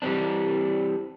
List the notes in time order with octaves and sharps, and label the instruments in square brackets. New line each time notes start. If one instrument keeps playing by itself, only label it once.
[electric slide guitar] E3 G3 A#3 C4 D4